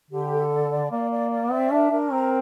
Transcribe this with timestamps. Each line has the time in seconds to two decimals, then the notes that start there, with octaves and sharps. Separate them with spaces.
0.11 D3 G4
0.31 A4
0.51 D5
0.71 D5
0.91 A#3 D5
1.11 D5
1.31 D5
1.51 C4 E5
1.71 D4 A#4
1.91 D4 A#4
2.12 C4 A#5